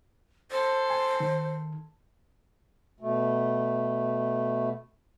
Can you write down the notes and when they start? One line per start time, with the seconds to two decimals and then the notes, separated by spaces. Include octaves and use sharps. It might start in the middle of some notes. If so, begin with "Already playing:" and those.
0.51 A4 C5 C6
0.90 G#5
1.20 D#3
3.00 B2 A3